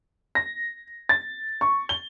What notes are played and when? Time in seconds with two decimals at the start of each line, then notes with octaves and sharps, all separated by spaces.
0.35 A#6
1.09 A6
1.61 C#6
1.89 G7